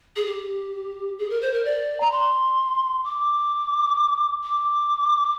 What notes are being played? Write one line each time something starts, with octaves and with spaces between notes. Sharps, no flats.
G#4
G4
G#4
A#4
C5
A#4
D5
A#5
C6
D6
D6